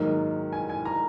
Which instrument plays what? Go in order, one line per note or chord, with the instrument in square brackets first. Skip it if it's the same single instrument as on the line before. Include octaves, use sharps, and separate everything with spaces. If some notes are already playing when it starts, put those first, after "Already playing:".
Already playing: [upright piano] G#2 D#3 F#3 A#3 D#4
G#5
G#5
A#5